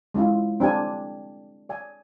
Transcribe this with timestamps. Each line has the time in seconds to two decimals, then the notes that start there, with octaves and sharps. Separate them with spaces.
0.14 G#3 C#4 E4 F4
0.60 C4 D4 G4 G#5
1.69 D5 G#5